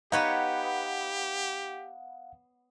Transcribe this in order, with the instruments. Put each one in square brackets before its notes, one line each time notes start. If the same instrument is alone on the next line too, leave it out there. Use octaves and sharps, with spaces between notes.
[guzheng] B3 B4 C#5 [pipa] D#4 [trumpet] G4 [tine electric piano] F5 F#5